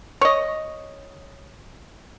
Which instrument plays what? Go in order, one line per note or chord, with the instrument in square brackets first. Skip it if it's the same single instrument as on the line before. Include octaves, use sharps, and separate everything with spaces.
[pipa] C#5 D#5